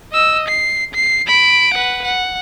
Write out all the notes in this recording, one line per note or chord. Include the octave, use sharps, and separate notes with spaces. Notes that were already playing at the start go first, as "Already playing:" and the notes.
D#5 E6
C7
C7
B5 D7
B4 F#5
F#5